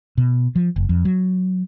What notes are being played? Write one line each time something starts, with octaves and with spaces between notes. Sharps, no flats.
B2
F3
F#1
F2
F#3